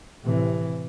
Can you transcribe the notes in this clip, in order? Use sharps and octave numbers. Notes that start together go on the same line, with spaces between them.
A2 C3 E3